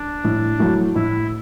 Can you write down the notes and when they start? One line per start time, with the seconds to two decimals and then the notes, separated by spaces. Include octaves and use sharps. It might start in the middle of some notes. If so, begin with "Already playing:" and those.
Already playing: D4
0.24 A2
0.59 F#3 A3 E4
0.95 A2 E4